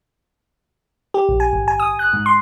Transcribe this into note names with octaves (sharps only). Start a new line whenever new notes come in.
G4
A#1
G#5
G#1
G#5
D#6
F#6
G#2
C6